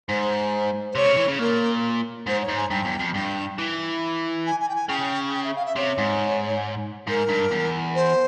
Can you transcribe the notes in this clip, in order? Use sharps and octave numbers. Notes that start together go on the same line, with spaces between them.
G#2 C5
C5
C3 C#5
C#3
E3
C#3
A#2 A#4
G#2 C5
C#5
G#2
G#5
G2 G5
E2
F2
G2 G5
E3
G#5
G#5
G5
G#5
C#3 G5
G5
E5
F5
E5
C3 C#5
G#2
G#2 A#4
G2
E2
C5